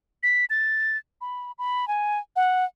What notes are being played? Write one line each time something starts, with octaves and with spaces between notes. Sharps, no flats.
B6
A6
B5
B5
G#5
F#5